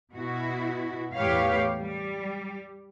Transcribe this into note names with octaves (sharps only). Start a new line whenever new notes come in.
B2 E4 F#4
E2 A2 G4 B4 C#5 F5
G3